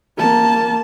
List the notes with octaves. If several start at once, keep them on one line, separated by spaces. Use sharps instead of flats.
A#3 A5